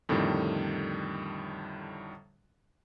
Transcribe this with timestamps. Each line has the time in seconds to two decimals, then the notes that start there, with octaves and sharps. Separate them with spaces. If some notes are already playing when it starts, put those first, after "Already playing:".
0.09 F2 A2 D3 D#3 G3